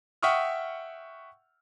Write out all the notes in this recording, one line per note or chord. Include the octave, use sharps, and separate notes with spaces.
E5 F#5 G5 C#6 D#6 F6